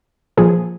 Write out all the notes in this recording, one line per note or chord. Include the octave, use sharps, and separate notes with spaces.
A#2 F3 G#4